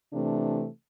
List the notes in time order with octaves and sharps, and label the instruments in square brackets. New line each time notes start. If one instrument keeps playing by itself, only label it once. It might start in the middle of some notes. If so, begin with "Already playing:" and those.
[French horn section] C3 E3 A3 D4